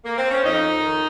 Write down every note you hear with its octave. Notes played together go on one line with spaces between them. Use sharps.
A#3
C4
C#4
F2 D#4
D#3